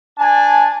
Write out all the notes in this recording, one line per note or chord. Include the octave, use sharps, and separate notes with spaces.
D4 G#5 A5